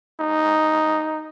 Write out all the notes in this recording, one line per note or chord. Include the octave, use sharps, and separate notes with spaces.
D#4